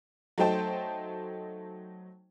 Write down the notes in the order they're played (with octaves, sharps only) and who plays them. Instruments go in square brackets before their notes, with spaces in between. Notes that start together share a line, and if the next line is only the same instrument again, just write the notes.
[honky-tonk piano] F#3 A3 D#4 C5 G5 A5